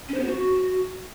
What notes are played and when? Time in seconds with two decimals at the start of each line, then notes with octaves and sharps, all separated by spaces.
0.09 C#4
0.14 C5
0.20 B3
0.25 F#4